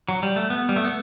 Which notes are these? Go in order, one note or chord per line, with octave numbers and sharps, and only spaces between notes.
F#3
G3
A3
B3
G3
A3
B3